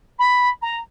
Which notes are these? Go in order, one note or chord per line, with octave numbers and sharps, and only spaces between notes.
B5
A#5